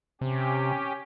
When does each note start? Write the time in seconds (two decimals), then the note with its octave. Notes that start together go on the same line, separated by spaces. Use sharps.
0.21 C3 C#4 G4